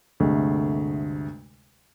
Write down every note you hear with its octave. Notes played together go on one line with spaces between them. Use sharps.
D2 G2 C3 G#3 A3